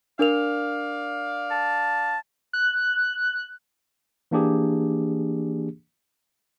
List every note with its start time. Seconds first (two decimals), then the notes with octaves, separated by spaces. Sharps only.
0.19 D4 A#4 D5 F5 F7
1.51 A5
2.53 F#6
4.31 E3 A#3 D4 G4 G#4